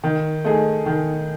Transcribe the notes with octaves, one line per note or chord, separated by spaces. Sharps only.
D#3
A3 D#4 G#4
D#3